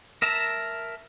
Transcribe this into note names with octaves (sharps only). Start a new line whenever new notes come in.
A#4 E5 A5 A#5